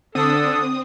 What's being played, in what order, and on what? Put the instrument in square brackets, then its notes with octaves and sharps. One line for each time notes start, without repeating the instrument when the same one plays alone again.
[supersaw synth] D3 D4 [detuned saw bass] C4 [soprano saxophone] A4 [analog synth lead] D#6